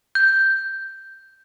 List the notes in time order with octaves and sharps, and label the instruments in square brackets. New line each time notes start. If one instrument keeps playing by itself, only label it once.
[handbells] G6